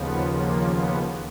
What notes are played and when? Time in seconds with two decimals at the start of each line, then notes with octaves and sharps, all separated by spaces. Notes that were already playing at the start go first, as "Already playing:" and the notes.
Already playing: D#2 C#3 F3 B3
0.26 A#3
0.64 B3